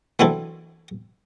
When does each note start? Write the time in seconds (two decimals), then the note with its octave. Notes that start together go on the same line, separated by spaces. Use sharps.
0.19 E3 F#3 C4 D4 E4 A4